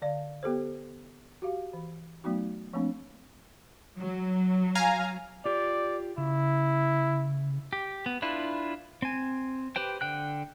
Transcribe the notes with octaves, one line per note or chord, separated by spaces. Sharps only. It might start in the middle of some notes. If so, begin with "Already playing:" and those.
D3 D5 F5
B3 G4 A4 C5
F#4 G4 F5
E3
F#3 A3 B3 D#4 F#4
F3 A3 A#3 C4 D4
F#3
F5 G#5 A#5
F4 G4 D5
C#3 E4
G4
B3
D4 E4 F4 B4
C4 G#5
G4 B4 C5 G5
D3 G5 F#6